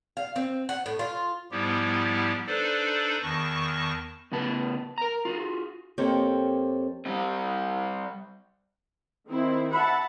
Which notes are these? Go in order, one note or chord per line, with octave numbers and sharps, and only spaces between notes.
F5
C4
F#5
A2
F4
G#2 F3 G3 B3 E4 G4
D4 D#4 A4 B4 C5 D5
E2 D#3 A5 C#6 A#6
A2 C#3 B3 G4 B4 A5
A#4 A#5
F4 F#4 G#4
F2 A#3 C4 G4 A4 C#5
G3 C4
D#3 C4 E4
E5 F#5 A5 B5